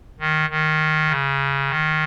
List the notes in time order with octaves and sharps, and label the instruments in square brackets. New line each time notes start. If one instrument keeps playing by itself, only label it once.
[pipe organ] D#3
D#3
C#3
D#3